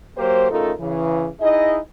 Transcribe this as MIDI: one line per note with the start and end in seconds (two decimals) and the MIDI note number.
0.17 0.46 54
0.17 0.46 58
0.17 0.46 67
0.17 0.46 72
0.50 0.72 49
0.50 0.72 57
0.50 0.72 63
0.50 0.72 65
0.50 0.72 69
0.50 0.72 70
0.79 1.28 49
0.79 1.28 52
1.41 1.78 63
1.41 1.78 64
1.41 1.78 68
1.41 1.78 75